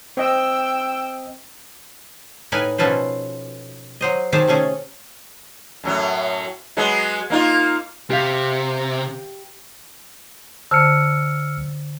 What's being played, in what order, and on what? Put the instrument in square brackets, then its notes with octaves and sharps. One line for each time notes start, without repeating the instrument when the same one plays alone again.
[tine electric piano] C4 D#5 [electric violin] G5 E6
[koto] A2 D#4 A#4 B4 G#5
B2 F3 C#4 A4 B4 C5
F#3 C5 D#5
D#3 C4 G4 G#4 C5 A5
C3 A3 C#4 G#4 A4
[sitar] F#2 A2 F#3
F#3 G#3 B3
A#3 D#4 F4
[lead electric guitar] C3 [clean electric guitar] G4 F5
[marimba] D3 C5 A5 [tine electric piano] E6 F6 C#7